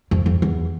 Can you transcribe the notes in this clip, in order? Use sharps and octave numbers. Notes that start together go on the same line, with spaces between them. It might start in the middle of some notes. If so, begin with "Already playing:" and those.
F2
F2
E2